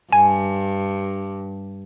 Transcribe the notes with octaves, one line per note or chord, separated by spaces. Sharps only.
G2 G#5